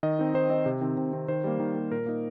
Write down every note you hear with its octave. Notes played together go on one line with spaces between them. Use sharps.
D#3 D#5
C4 D#4
D#3 C5
C4 D#4 D#5
C3
D#3 C4
C3
D#3 C4
D#3 C5
G3 A#3
D#3
G3 A#3
A#2 A#4
A#3 D#4